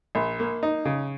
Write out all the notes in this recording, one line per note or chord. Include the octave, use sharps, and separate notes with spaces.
A#1
A#3
D#4
C#3